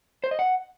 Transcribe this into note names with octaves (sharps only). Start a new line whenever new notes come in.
C5
D#5
F#5